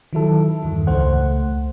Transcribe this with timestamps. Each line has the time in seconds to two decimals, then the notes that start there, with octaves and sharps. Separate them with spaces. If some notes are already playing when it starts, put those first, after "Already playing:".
0.13 D#3 F#3 E4 A4
0.63 E2 G2 D#3
0.87 C#2 A3 C5 F#5